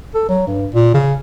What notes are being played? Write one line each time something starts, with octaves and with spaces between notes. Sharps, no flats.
A4
F#3
G2
A#2
C#3